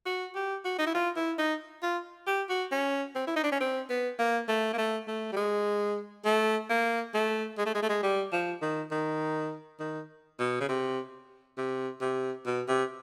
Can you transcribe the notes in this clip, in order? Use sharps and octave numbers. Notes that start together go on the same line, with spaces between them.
F#4
G4
F#4
D#4
E4
F4
E4
D#4
F4
G4
F#4
C#4
C4
E4
D#4
D4
C#4
C4
B3
A#3
A3
A#3
A3
A3
G3
G#3
A3
A#3
A3
G#3
A3
G#3
A3
G#3
G3
F3
D#3
D#3
D#3
B2
C#3
C3
C3
C3
B2
C3